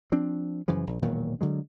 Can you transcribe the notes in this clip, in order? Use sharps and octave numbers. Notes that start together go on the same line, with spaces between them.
F3 C4 D4
F#2 C#3 E3 F3
A#1
E1 A#2 D#3 F#3
D3 F#3 G#3